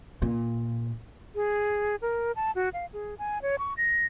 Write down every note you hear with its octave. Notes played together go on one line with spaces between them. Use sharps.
A#2
G#4
A#4
A5
F#4
F5
G#4
G#5
C#5
C#6
A#6